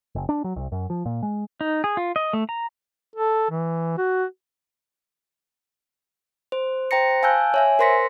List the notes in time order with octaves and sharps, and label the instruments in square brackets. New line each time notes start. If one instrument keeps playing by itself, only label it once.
[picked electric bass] F#1
D4
F#3
C2
F#2
F3
A#2
G#3
[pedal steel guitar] D#4
G#4
F4
D#5
A3
A#5
[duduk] A4
E3
F#4
[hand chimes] C5
C5 G5 A#5 A#6 C#7
F5 G#5 A5 E6 F#6 G6
C#5 E5 G#5
A#4 C5 C6 A#6 B6 C#7